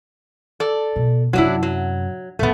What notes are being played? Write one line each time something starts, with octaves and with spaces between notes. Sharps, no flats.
A4 D5
B2
F#2 C3 F#3 D4 E4
F#3
D1 C#3 A3 B3